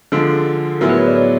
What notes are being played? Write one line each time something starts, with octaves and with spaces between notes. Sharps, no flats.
D3 F3 G#3 A4
A2 F#3 B3 E4 G#4 A#4
B4
C#5
D5
C#5